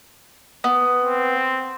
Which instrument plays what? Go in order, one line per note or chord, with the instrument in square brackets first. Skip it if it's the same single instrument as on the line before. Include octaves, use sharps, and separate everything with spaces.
[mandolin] B3
[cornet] C4